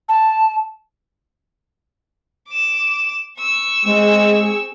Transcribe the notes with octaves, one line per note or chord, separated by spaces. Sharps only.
A5
D6 E7
C#6 E6
G#3 C4 G#4